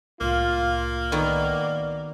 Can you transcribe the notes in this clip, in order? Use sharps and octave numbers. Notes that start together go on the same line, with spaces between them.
C2 A2 A#3 F4
D#3 B3 F#4 D5